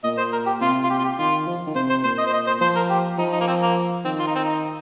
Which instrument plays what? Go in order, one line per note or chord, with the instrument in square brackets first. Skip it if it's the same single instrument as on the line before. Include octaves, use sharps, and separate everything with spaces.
[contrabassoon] A#2 [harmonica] D#5
[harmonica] C5
A#4
G4
[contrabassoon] C3 [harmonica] F4
[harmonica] F4
G4
F4
G4
[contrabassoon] D#3 [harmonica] F4
[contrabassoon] F3
D#3
[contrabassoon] C3 [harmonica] C5
[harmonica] C5
[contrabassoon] A#2 [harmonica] C5
[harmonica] D#5
C5
D#5
C5
[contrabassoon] F3 [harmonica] C5
[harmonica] A#4
G4
[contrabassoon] F3 [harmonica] D#4
[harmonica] D#4
A#3
C4
A#3
[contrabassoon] D#3 [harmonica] C4
[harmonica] F4
D#4
C4
D#4